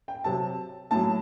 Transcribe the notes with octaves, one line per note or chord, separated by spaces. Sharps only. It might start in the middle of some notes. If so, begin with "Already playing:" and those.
G5
C3 F#3 A5
A2 F#3 A5